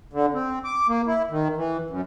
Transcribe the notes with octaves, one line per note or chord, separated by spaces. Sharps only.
D3
C4
D6
A#3
E4
D#3
E3
F#2